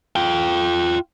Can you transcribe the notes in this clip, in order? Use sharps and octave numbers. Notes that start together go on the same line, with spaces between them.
F4 G5